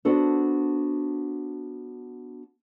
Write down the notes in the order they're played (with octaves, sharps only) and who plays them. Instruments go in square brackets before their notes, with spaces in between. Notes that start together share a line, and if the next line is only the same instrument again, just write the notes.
[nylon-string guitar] B3 D4 F#4 A4 C5